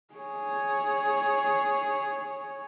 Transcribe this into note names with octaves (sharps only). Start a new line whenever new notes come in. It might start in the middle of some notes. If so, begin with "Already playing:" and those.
G#4 C#5